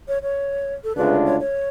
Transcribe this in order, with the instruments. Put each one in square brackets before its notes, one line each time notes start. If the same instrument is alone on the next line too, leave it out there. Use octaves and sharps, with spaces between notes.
[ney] C#5
C#5
A4
[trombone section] D2 C#3 G#3 D4 F4 [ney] B4
[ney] C#5
C#5